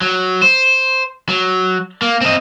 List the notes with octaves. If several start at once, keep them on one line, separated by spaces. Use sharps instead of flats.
F#3
C5
F#3
A#3
C4 D#5